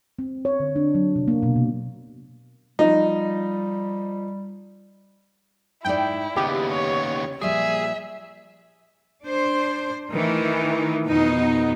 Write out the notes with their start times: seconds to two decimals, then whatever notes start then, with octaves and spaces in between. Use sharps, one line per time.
0.19 C4
0.45 C#5
0.60 D3
0.76 D4
0.95 F#3
1.16 C3
1.28 A#3
1.43 B2
1.56 C3
2.79 F3 G3 D#4
5.85 G#2 D#4 E4 D5 G5
6.36 D#2 C#3 B3 G4
6.71 C#5
7.42 A#2 F3 G3 G#4 E5
9.23 D4 C5
10.13 D#3 E3 A3
11.05 F2 B2 B3 D#4